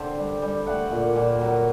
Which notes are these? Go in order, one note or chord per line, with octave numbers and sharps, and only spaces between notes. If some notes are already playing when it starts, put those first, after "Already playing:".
Already playing: D3 G4 A4 C5
G3
G3
A3 F#5
A#2
A#2
F#3